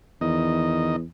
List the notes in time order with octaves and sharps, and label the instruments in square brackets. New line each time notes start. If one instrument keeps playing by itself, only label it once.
[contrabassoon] E2 [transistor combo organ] D#3 D#5